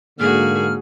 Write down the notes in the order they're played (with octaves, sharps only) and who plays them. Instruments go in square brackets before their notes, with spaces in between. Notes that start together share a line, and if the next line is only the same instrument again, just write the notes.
[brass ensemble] G#2 D3 A#3 [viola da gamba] F#4 G#4 [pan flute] F6